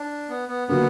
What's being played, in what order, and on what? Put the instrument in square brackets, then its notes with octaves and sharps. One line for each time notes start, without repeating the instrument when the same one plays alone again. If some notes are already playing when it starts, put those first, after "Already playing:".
Already playing: [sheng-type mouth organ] D4
B3
B3
[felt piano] D3 F#3 A#3 D4 [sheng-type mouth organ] B3